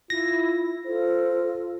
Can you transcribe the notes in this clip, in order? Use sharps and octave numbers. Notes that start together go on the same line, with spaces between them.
E4 F4 A#6
F4 A4 C5